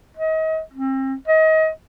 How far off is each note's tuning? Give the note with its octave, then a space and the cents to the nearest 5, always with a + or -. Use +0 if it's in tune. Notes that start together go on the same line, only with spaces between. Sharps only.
D#5 +35
C4 +35
D#5 +30